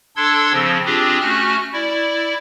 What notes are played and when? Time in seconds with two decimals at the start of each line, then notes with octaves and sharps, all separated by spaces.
0.16 D4 A4 C6 E6 G#6
0.53 C#3 F3 C4
0.85 C4 D4 F4 G4 G#4
1.21 A3 C#4 F#4 F6 F#6
1.73 E4 D5